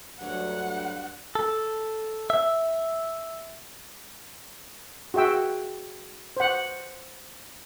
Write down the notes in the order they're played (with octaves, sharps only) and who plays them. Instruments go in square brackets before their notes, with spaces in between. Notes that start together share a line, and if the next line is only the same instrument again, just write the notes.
[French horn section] D2 F#3 [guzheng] G2 C#5 [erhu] F#5
[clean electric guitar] A4
E5
[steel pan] F#4 G#4 E5 G5 E6
C5 F#5